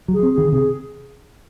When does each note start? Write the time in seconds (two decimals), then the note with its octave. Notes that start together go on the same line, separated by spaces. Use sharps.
0.08 F#3
0.13 G#4
0.23 C4
0.33 D#3 G#4
0.52 C3 G#4